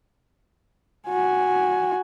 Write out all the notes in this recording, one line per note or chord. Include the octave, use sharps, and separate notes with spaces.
F#4 G#5